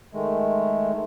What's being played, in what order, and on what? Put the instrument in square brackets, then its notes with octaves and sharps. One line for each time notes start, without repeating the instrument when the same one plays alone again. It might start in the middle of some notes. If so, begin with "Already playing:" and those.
[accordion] D#3 G#3 A3